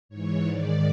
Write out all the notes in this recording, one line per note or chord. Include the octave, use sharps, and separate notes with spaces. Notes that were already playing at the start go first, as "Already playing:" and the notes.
G#2 E3 C#5
G#2 D#3 D5